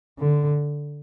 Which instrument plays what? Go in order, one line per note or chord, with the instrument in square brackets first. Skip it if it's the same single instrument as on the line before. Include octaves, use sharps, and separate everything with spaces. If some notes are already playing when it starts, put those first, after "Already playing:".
[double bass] D3